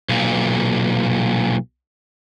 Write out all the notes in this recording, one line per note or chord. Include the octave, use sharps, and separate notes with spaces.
B1 A#2